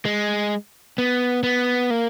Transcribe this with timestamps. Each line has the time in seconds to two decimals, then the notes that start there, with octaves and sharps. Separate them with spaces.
0.05 G#3
0.98 B3
1.43 B3
1.90 A#3